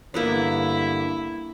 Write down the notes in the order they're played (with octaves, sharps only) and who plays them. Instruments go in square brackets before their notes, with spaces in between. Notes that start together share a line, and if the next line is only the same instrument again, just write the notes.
[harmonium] G2 D3 [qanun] A#3 B3 D4 [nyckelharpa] E4